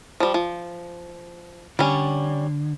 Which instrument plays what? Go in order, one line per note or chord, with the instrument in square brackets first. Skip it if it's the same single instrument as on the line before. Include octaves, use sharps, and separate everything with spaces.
[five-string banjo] F3 G3
F3
[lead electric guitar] D3 [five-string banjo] G3 C#4